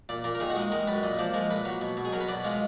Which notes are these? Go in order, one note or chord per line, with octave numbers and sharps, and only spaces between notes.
A#2 D5
A#2 A#4
A#4
D#3 G#4
F#4
G#3
D#5
G#3 A#4
F#2 B4
A#2 D#5
F3 D5
G#3 A#4
A#2 B4
F#3
B2
B2
G#4
F#3 A#4
B4
B2 D5
G#3 F4